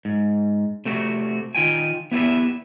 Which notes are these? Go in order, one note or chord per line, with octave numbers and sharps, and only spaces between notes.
G#2
C3 A3 C4 F#4
D#3 F4 G5 G#5
B3 E4 G4 G#4 B4 E5